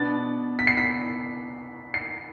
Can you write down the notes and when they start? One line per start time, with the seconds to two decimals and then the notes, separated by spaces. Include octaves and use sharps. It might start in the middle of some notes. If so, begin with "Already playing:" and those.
Already playing: B2 B3 D4 A6
0.59 B6
0.67 C7
0.77 B6
1.94 C7